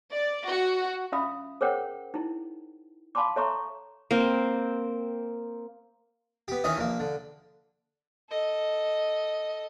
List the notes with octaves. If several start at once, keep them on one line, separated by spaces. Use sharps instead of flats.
D5
F#4
C#4 F4 E5 F5 B5 D#6
G#4 A#4 C5 C#5 F#5 G5
D#4 E4
F5 A5 B5 C6 D6
A4 C#5 E5 A#5 C6 C#6
A#3 C4
B3 G4
D#3 E3 C#4 D#4 D#5
A#1 A#3
D3
A4 D#5